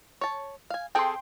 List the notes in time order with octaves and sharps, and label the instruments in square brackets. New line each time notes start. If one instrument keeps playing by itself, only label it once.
[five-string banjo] C#5 A5
F5 G#5
[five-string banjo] C4 G#4 A4 [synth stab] G5 C6